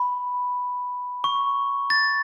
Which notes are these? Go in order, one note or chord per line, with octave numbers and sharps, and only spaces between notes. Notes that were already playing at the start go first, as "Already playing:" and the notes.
Already playing: B5
C#6
A6